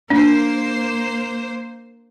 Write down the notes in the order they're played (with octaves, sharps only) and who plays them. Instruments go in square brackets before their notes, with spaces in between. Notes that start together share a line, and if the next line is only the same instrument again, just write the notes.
[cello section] A#3 C5 [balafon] D4